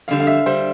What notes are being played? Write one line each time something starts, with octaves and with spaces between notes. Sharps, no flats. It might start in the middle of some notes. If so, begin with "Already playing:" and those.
F2 D3 G3 F5
F5
E5
D3 G3 C5